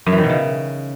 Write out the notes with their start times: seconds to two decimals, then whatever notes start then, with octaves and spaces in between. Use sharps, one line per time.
0.06 F#2
0.12 E3
0.18 D#3
0.24 B2
0.29 C#3